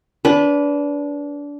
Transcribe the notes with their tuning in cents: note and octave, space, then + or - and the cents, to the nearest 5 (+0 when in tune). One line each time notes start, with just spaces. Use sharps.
D4 -25 B4 +0